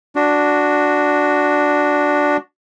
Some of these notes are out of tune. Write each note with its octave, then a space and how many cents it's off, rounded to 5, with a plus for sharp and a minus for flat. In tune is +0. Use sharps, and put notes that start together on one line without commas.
D4 +0 F#4 +0